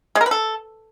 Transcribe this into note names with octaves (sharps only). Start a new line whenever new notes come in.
G#3
A#4
B4
A4